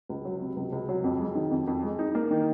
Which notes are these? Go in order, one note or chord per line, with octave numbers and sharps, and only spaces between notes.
C#2
F#3
C3
C#2
C#2
F#3
F2
G#3
D#3
F2
F2
G#3
D#4
A#3
D#3